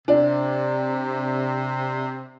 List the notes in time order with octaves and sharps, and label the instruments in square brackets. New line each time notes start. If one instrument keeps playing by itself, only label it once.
[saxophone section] C3 [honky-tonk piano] D4